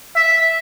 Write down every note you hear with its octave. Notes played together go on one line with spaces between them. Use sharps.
E5